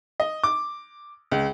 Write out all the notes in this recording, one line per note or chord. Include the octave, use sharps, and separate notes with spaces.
D#5
D6
C#2